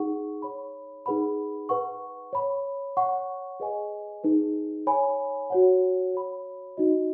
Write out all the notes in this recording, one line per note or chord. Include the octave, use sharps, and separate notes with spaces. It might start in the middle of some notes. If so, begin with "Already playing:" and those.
Already playing: D#4 G#4 F#5 C#6
C#5 B5
D#4 G#4 B4 F#5 B5
B4 F#5 C#6
C#5 B5
C#5 F#5 C#6
G#4 B4 D#5 G#5
D#4 G#4 B4
C#5 G#5 B5
F#4 C#5 F#5
C#5 B5
D#4 F#4 D#5